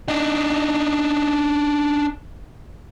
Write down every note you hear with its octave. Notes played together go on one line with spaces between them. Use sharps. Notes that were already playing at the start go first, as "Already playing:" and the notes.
D4 D#4